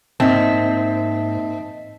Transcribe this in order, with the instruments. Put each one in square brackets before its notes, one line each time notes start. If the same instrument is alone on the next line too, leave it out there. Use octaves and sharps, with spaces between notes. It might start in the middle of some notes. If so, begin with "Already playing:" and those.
[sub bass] G#2 [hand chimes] A#3 D#4 B6 [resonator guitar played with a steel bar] C4 [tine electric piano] D#5 E5 A5